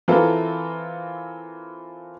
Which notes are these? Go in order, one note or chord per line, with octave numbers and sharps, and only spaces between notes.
E3 C4 F4 A4 A#4